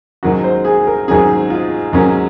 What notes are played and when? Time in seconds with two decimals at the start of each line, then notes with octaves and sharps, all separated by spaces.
0.23 G#2 D#3 F#3 A#3 C#4 F#4
0.44 C5
0.65 G#4
0.87 A#4
1.08 G#2 D#3 F#3 A#3 C#4 G#4
1.50 F4
1.93 G#2 D#3 F#3 A#3 C#4